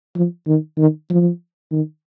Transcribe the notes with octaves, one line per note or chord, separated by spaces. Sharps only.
F3
D#3
D#3
F3
D#3